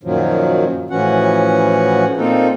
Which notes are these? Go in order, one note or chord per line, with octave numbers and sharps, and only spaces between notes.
F#2 A#2 D#3 F3 F#3
A2 E3 F3 C#4 F#4 F#5
A#2 A#3 C4 D#4 F4 A4